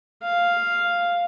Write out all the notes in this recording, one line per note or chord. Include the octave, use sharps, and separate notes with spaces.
F5